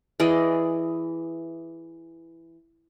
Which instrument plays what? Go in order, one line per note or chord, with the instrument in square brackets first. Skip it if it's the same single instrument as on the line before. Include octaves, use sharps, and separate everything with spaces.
[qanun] E3 G#4 D5 D#5